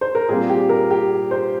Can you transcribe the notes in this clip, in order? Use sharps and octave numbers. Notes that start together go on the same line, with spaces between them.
C5
A#4
A#2 G3 C4 G#4
G4
A#4
G4
C5